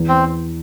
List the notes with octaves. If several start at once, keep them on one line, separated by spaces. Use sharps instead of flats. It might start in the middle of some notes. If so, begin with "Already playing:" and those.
Already playing: E2
C4